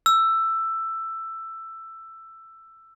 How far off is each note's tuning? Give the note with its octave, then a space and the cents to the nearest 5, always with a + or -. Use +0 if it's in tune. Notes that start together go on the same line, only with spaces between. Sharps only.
E6 +10